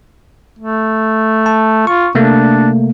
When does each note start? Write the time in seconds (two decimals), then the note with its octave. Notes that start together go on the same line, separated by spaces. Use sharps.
0.59 A3
1.46 A5
1.87 F4 C#6
2.15 C3 A3 A#3 D4